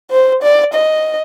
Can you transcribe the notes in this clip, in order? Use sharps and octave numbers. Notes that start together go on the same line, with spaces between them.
C5
D5
D#5